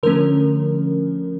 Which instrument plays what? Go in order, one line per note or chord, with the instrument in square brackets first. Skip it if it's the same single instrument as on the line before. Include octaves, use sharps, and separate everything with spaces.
[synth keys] D3 F3 A3 C#4 A#4